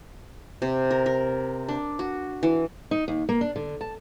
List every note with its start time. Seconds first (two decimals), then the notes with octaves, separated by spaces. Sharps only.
0.62 C3
0.91 A#4
1.06 A#4
1.68 D4
1.99 F#4
2.43 E3
2.91 D#4
3.08 D#2
3.29 A#3
3.41 D4
3.56 D3
3.81 A5